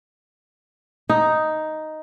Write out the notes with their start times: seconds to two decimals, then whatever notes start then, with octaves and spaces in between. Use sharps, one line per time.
1.09 D#4